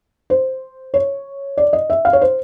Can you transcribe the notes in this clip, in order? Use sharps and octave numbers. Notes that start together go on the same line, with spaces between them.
C5
C#5
D5
D#5
E5
F5
C#5
C5